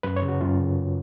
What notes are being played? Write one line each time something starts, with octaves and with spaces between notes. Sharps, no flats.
F#2 B4
C#5
C#3
F#4
F#2 F4
C#3